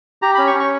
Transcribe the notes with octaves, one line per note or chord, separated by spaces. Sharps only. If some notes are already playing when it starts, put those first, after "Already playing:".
G4 A#5
C#4 B5
C#6
C#4
C#6